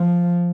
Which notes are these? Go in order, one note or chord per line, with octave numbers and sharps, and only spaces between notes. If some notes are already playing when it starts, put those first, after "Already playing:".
Already playing: F3